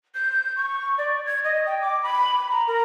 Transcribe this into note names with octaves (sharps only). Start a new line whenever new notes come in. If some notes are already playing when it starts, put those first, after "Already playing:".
G6
C#6
D5
G#6
D#5
G5
D6
B5
A#5
A#4